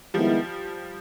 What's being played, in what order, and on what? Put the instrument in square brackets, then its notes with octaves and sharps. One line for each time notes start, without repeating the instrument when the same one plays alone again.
[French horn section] D#3 G#3 B3 E4 [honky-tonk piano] F3 G3